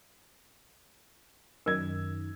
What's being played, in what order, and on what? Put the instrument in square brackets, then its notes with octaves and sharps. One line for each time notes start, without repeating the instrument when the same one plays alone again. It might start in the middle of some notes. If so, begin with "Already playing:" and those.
[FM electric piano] F#2 D#3 [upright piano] E6 G#6